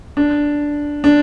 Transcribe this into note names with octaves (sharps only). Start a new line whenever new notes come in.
D4
D4